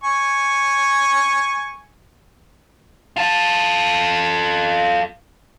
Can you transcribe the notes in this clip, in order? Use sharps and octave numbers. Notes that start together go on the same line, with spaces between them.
G#5 C#6
F4 A4